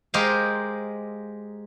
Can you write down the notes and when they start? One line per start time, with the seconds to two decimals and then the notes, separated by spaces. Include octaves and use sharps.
0.14 G#3 G4 A#4 C5 D#5 F5